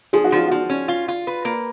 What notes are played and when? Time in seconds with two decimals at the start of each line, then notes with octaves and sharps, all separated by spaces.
0.13 F3 G#4
0.24 F#4
0.32 F3 F4
0.48 F3 F#4
0.70 C#4
0.88 F4
1.08 F4
1.27 B4
1.45 A#3